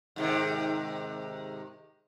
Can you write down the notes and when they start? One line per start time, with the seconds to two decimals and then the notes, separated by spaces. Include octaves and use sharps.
0.16 G#2 C3 D#3